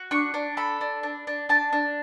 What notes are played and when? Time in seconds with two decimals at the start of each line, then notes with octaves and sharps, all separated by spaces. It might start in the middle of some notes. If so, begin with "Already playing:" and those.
Already playing: F#4
0.11 D4 C#6
0.34 D4
0.57 A4 B5
0.81 D4
1.03 D4
1.27 D4
1.49 D4 A5
1.73 D4